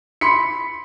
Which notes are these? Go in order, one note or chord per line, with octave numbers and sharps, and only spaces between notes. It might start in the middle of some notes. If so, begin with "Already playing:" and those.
B5 C6 B6 C#7